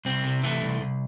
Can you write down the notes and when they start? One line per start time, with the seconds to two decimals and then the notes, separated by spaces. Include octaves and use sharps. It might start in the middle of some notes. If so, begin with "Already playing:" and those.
0.05 C2 C4
0.24 C3
0.44 E3 A3
0.62 C2
0.81 C2